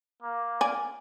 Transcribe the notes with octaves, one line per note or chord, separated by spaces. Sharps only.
A#3
D5 G#5